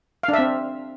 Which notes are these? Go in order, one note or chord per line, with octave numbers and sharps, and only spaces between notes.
F5
D4
E5
C4